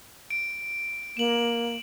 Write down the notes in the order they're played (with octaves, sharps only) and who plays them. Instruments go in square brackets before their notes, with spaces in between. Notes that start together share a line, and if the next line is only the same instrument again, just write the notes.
[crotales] D7
[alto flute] A#3 [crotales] E7 F#7